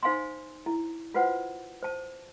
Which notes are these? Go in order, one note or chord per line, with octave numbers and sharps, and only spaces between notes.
D#4 C5 F5 G#5 B5 C6
E4
F4 F#4 B4 C5 F#5
C5 A5